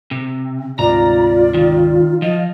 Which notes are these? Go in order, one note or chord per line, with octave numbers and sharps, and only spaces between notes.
C3
D2 G#2 C3 F4 D5 A#5
D#3
F3 F4 D#5